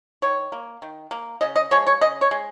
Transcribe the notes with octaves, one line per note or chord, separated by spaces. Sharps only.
D#3 C#5
A#3
D#3
A#3
C#3 D#5
D#5
F3 G#3 C#5
C#5
C#3 D#5
C#5
G#3